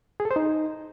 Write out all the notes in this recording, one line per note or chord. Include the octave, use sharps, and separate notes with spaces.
G#4
A4
C5
D#4